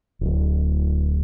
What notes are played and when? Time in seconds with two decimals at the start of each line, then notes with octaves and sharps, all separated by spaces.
0.21 D1